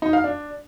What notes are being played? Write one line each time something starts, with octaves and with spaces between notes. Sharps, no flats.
D#4
F5
D4